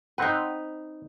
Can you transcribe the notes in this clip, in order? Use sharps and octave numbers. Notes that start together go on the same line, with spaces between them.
C4 D#4 B4 F#5